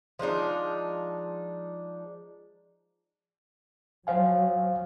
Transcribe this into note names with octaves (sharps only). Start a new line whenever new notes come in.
F3 G#3 D4 D#4
F#3 C5 F5 G#5